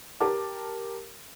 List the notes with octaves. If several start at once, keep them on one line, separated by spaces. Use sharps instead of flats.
G4 A#4 A5 D6